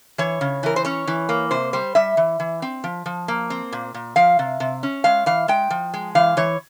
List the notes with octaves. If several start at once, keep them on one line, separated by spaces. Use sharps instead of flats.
E3 C#5
C#3
E3 A#4
C5
C#4 C#5
E3
A#3
C3 C5
G3 C5
G3 E5
E3
E3
C4
F3
F3
A#3
C4
A#2
A#2
F3 F5
C3
C3
C#4
G#3 F5
E3 F5
G#3 G5
F3
G#3
E3 F5
E3 C#5